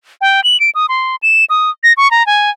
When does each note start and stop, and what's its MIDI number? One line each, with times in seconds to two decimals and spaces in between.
0.21 0.43 79
0.44 0.59 102
0.60 0.70 98
0.75 0.86 87
0.89 1.16 84
1.23 1.45 100
1.50 1.70 87
1.84 1.93 94
1.97 2.10 85
2.11 2.25 82
2.27 2.50 80